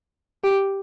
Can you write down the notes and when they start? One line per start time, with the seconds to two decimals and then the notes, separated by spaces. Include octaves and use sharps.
0.44 G4